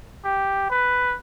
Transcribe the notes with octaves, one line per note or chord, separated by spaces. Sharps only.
G4
B4